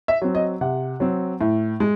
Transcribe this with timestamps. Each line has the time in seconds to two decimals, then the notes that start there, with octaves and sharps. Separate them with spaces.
0.08 E5
0.22 F#3 C4
0.35 D#5
0.61 C3 F#5
1.00 F#3 C4
1.41 A2
1.80 G#3